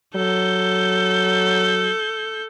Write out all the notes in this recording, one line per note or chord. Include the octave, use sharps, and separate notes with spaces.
F#3 A4 G6